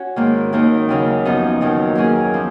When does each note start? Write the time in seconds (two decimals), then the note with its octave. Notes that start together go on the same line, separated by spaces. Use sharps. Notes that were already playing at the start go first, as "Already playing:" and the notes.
Already playing: C#4 F#4 C#5
0.16 G#2 D#3 A#3
0.53 D#2 D#3 A#3 D#4
0.89 D#2 C#3 F#3 C#4
1.25 F#2 F3 B3 D#4 F#4
1.61 D#2 D#3 F#3
1.95 F#3 A#3 C#4 G#4
2.34 F3